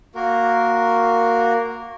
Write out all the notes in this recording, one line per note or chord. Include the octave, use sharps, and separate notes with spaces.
A#3 F#4 A#4